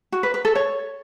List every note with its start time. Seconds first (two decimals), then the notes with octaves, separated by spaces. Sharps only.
0.12 F#4
0.23 B4
0.34 B4
0.45 A4
0.55 C#5